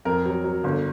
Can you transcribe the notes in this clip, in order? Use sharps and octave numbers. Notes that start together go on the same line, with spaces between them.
F2 A#4
F#3
F#3
G1